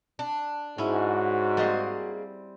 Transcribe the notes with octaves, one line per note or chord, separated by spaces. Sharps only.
D4
G#2 C#4 E4 F#4
G3 A#3 C4 G#4 D#5